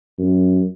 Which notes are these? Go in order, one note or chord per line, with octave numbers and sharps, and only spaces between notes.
F#2